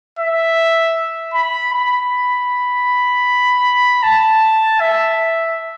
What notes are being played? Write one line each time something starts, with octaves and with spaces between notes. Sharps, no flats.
E5
B5
B5
A5
E5